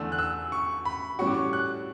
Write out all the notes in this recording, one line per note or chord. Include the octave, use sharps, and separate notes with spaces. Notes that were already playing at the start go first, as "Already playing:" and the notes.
Already playing: E2 D3 A3 D4 E6
F#6
E6
C#6
B5
A2 E3 G3 C#4 F#4 C#6
D6
C#6
F#6